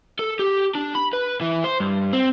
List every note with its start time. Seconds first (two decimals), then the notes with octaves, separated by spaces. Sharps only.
0.19 A4
0.39 G4
0.75 D4
0.95 B5
1.13 B4
1.41 E3
1.64 C5
1.80 G2
2.13 C4